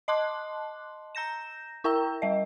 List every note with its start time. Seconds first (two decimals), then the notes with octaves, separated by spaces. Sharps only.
0.08 D#5 A5 C6 D6 F#6
1.15 A#5 G6 A#6 E7
1.84 E4 A#4 G5 A#5 E6
2.22 G3 D#5